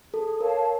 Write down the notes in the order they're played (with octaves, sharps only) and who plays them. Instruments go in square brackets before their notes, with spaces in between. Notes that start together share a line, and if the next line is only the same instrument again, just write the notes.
[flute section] G#4 [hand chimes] A4
[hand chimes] A#4 [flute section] C#5 F5 A5